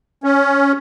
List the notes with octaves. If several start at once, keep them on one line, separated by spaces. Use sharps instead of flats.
C#4